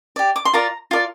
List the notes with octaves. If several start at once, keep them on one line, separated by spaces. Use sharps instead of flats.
G4 D5
D6
C6
F4 A#4 D5 A#5
F4 A#4 D5